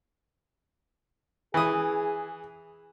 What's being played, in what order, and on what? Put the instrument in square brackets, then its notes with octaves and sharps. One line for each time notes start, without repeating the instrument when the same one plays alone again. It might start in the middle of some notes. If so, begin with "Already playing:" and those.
[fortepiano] E3 D#6 [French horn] G#4